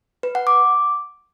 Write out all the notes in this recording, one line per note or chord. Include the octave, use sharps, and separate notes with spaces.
B4
F#5
D6